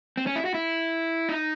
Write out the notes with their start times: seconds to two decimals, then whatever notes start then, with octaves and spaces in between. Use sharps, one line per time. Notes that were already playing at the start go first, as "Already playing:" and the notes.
0.17 C4
0.27 C#4
0.36 E4
0.45 F#4
0.54 E4
1.29 D#4